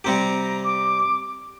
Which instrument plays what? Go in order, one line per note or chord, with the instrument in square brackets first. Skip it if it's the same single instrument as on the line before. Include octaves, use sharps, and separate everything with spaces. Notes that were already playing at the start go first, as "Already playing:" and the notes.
[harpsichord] C3 G3 C4 G4 [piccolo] A#5
[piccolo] D6